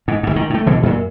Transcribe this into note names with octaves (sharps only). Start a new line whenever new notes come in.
G#2
G1 G#2
G#2 D#3
A2 A3
C#2 B2 E3
F#2 A#2